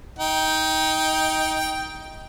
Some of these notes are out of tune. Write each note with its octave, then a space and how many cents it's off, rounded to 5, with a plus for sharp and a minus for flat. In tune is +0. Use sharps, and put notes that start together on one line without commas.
D#4 +20 G5 +0